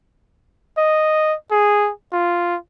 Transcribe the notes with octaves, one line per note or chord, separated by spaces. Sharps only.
D#5
G#4
F4